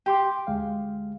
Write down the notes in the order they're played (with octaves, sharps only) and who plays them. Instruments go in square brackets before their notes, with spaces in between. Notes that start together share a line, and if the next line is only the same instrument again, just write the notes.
[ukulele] G4 [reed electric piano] G5 C6 D6
[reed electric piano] D2 G#3 F5